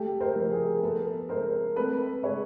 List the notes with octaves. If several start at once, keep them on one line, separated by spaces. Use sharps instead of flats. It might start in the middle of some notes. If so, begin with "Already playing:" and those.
Already playing: A3 G4 A4
A#4 C5
F3
G#4 A#4
B3 A4 B4
G#3 A#4 C5
C4 A4 B4
G#3 B4 C#5